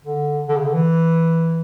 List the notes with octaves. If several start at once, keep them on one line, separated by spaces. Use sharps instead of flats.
D3
D3
C#3
D3
E3